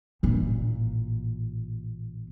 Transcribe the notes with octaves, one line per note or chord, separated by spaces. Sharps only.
A1 A#2